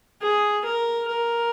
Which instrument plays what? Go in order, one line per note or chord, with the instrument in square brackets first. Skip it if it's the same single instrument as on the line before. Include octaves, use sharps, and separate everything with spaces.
[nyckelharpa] G#4
A#4
A#4